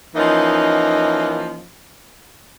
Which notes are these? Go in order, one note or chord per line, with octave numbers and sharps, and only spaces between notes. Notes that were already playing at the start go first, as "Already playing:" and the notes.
E3 F3 A#3 C#4 D#4 D#5